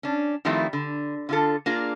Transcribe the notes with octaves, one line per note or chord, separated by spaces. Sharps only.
C#4 D4
D#3 F3 G3 A3 C4 E4
D3
D3 F4 A4
A#3 D4 F4 G#4